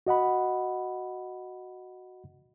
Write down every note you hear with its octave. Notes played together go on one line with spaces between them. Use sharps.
F#4 D#5 F#5 B5